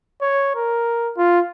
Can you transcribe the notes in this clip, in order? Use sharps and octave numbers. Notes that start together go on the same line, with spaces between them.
C#5
A#4
F4